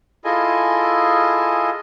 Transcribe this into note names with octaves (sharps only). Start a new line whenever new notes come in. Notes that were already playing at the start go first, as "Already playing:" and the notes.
E4 F4 G#4 A4 D#5 G#5